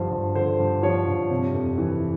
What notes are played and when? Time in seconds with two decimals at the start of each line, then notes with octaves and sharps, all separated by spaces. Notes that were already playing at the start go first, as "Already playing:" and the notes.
Already playing: G2 D3 F3 C5
0.11 G2
0.35 D3 C5
0.60 G2
0.83 F3 C#5
1.07 G2
1.30 C3
1.54 F2
1.78 E3